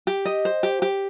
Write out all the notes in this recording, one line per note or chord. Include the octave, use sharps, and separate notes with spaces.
G4
D#5
C5
G4
G4